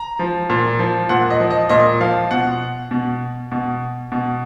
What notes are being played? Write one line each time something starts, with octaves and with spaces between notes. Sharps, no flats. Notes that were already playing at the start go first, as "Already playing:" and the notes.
Already playing: A#5
F3
A#2
F3
A#2 F#5
D#5
F3
D#5
A#2 D#5
F3 F5
B2 F#5
B2
B2
B2